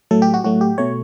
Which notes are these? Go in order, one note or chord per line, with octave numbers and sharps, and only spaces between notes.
A2 F#3 A3 A4
G4
F#4
A2 F#3 A3 F#4
G4
B2 A3 C#5